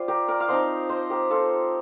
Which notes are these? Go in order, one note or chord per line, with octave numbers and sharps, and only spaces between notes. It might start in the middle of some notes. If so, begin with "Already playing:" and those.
Already playing: G3 F4 C5
G4 A#4
A#4 D5
F5
F3 C4 D#4 C5 D#5
C5 D#5
G4 A#4
F4 A4